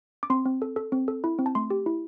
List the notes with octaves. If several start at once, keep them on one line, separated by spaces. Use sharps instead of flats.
D6
C4 C6
C4
A4
A4
C4
A4
E4
C4
A5
A3 C6
G4
E4